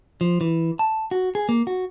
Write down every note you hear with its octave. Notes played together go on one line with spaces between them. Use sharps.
F3
E3
A5
F#4
G#4
A#3
F#4